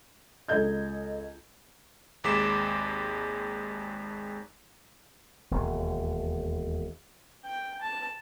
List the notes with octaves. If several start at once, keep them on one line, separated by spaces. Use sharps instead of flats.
C#2 A4 D#5 G6 G#6
G#1 D#2 G#3 D6 B6 E7
E1 D#2
G5
A5